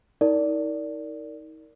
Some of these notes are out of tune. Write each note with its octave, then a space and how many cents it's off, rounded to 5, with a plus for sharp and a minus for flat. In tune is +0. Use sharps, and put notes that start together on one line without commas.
D#4 +35 A#4 -15 D5 -15